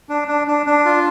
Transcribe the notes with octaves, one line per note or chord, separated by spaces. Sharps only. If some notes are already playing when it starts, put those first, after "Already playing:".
D4
D4
D4
D4
F4